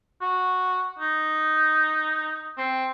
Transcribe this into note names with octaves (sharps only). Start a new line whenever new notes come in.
F#4
D#4
C4